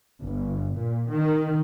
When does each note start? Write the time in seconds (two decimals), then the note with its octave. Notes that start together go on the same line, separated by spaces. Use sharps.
0.25 G1
0.78 A#2
1.11 D#3